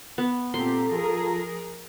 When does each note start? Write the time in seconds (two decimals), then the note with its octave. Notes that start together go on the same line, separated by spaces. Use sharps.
0.18 B3
0.54 A#2 C4 F4 G4 A4 A#5 C6
0.90 F3 G#4 A#4